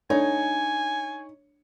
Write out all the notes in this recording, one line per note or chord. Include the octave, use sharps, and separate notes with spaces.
A3 D4 D#4 C#5 G#5